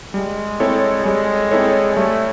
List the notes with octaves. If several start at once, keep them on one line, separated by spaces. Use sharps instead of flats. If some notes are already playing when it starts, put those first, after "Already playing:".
G3 G#3
C4 E4 A4 C#5
G3 G#3
C4 E4 A4 C#5
G3 A3